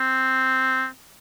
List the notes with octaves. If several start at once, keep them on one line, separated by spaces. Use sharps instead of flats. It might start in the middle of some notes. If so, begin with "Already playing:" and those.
Already playing: C4